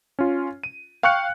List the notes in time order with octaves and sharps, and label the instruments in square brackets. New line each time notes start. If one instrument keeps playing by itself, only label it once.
[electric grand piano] C#4 F4
D#7
F5 G5 C#6 F6 F#6 C#7